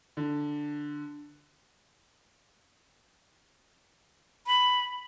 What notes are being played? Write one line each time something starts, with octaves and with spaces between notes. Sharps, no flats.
D3
B5